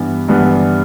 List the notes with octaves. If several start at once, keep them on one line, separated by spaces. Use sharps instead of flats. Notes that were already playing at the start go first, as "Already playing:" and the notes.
Already playing: G2 E3 B3 D4
G2 E3 B3 D4